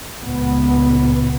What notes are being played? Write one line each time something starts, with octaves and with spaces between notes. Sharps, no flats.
C#2 A#2 B3